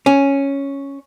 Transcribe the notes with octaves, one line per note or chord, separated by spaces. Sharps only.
C#4